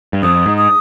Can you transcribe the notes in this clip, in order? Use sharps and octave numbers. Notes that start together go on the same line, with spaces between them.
G2
F2 D#6
G#2
D#6